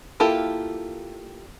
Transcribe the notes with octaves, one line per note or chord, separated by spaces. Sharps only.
A#3 E4 F4 G4 A4